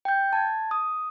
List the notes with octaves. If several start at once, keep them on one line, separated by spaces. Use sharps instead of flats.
G5 G6
A5 G#6
D#6